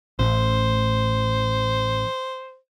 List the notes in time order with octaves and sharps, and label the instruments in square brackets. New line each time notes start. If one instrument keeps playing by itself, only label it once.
[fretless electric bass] A1 [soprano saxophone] C5